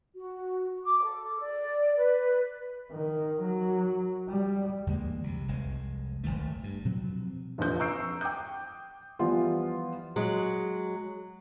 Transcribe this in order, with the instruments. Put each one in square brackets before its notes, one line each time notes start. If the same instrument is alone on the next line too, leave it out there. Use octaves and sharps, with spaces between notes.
[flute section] F#4
D6
A4
D5
B4
[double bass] D#3
F#3
G3
[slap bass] E2 D3 G#3 A#3
C2 C3
F1 C2 G#3
F1 F2 D#3 A3
G2
B2 F3 F#3 C4
[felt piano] F1 A#1 F3 G6
A#5 C#6 E6 G6 C7 D7
G5 D6 D#6 G6
E3 F3 G3 B3 F4
[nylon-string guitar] F#3 G#3